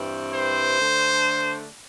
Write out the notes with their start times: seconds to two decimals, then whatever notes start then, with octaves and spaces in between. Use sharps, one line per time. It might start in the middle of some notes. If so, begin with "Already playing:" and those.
Already playing: G2 E3 C4
0.33 C5
0.79 D3 A3 D4